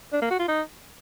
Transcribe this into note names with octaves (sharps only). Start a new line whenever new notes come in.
D4
A#3
F#4
F4
D#4